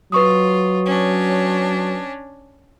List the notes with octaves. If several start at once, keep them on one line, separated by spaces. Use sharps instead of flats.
F#3 F4 B4 C#6 D#6
C#4 D4